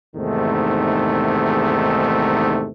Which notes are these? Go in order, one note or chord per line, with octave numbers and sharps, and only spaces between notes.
E2 G#2 C3 D#3 A3